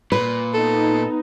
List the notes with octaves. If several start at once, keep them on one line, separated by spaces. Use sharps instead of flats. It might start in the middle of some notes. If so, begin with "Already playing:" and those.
A#2 B4
B3 D#4 A4